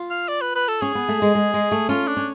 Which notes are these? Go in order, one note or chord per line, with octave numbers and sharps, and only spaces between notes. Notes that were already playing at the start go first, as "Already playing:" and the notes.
Already playing: F4
F5
D5
B4
B4
A4
C#4 G#4
B3
A3
G#3
G#3
G#3
A3
C#4 F4
D4
C#4